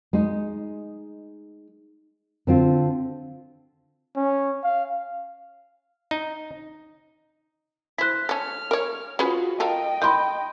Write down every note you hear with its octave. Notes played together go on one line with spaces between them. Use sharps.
G#3 D#4
D3 C4 F4
C#4
F5
D#4
E4 C5 F#6 B6
C#4 A4 F6
A#4 C#5
C#4 F4 F#4 G#4 B4
F4 A4 A#4 D#5 G5
D#3 G4 B5 C6 G6